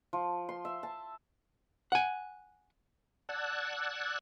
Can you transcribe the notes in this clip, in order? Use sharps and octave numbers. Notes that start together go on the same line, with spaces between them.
F3
C6
E5
A5
F#5 G#5
D5 F#5 A5 E6 F#6 G#6